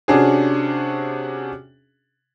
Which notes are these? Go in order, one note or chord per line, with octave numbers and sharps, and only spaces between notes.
C3 C#4 D4 F#4 G#4